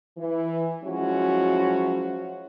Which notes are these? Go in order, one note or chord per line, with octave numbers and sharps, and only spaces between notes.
E3
F3 F#3 G#3 C#4 E4 F#4